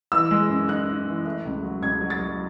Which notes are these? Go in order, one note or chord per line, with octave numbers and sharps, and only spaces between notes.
E3 E6
G#3
F#2
D#4 F#6
D#4
E3
A3
C#2
F#3
C#2 G#6
F#3
A6
F#3